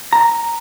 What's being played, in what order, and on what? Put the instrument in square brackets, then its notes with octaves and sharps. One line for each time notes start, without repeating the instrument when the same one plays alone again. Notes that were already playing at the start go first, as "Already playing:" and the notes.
[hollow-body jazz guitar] A#5